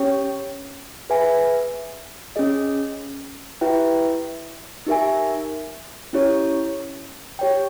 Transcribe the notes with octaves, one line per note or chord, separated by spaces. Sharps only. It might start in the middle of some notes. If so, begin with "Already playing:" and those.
Already playing: C#4 G4 C#5 G5
G#4 B4 E5 G#5
C#4 G#4 D#5
E4 G4 B4 E5 G5
D#4 G4 A#4 E5 G#5
C#4 E4 G4 C#5
G4 C#5 G5